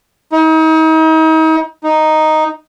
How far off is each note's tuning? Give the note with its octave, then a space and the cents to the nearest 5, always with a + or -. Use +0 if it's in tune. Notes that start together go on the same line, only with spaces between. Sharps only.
D#4 +40
D#4 +0